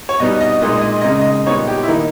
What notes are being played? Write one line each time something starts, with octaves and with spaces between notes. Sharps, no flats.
C#5
B2 G3 B3 D#4 D#5
D#5
A#2 G#3 D#4 D#5
D#5
C#3 G#3 D#4 D#5
D#5
A#2 G3 B3 D#4 C#5
G4
E4
D#3 A#3 D#4